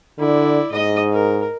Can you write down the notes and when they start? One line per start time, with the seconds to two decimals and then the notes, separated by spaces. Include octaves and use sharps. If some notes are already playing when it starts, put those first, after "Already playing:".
0.19 D3 E4 D5
0.72 G#2 D#5 D#6
1.13 A#4